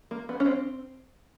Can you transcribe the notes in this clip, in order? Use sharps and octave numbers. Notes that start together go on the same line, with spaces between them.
A#3
B3
C#4
C4